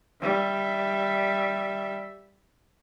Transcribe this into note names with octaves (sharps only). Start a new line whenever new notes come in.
G3 E5